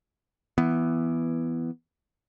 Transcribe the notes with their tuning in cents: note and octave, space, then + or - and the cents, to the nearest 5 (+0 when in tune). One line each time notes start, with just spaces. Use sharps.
E3 +10 B3 +0